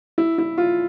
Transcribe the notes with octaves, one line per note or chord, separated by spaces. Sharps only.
E4
E4
F4